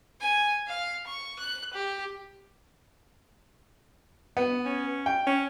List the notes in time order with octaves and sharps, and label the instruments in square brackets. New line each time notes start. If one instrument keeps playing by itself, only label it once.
[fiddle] G#5
F5
C#6
F#6
G4
[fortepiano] B3
[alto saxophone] C#4
[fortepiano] G5
[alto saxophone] C#4